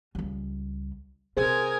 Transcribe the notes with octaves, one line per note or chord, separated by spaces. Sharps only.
C#2 G3
C3 G#4 A#4 C5 G#5